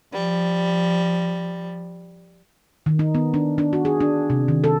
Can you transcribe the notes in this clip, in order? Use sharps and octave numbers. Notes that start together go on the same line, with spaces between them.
F3 G3
D#3
D#4
B3
D4
D4
F#4
G#4
D4
C3
D#3
A4